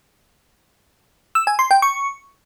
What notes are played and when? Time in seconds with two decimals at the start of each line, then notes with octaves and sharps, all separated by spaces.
1.35 E6
1.47 G#5
1.59 C6
1.71 G5
1.82 C#6